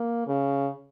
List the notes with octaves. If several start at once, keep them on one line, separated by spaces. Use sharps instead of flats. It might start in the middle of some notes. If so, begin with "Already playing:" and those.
Already playing: A#3
C#3